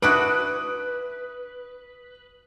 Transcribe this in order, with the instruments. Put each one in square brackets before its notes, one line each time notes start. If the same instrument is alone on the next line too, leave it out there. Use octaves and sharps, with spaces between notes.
[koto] D4 E4 F#4 [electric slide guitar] B4 [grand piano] D#6 F#6 D7